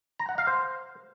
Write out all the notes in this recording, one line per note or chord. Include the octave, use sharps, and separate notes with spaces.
A#5
F#5
F5
C5